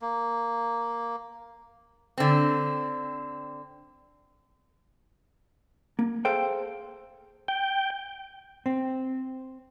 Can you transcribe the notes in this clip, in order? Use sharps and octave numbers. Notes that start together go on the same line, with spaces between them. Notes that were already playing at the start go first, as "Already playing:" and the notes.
A#3
D3 C4
A#3
G#4 A4 C5 F5 G5
G5
C4